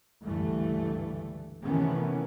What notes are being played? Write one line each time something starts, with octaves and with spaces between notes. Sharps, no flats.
C#2 G2 D3 E3 A3
C3 D#3 E3 A3 B3 C#4